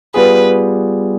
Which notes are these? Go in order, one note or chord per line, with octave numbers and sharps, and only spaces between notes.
G3 B3 F4 G#4 B4